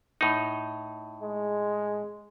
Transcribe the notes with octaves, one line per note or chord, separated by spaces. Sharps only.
A2 D#4
G#3